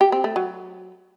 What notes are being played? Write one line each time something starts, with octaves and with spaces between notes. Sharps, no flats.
G4
C4
A3
F#3